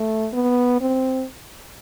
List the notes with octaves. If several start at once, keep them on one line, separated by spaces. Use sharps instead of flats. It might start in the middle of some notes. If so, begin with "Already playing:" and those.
Already playing: A3
B3
C4